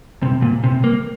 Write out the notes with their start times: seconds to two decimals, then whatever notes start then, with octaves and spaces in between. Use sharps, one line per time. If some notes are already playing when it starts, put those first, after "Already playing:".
0.23 C3
0.42 A#2
0.64 C3
0.84 A#3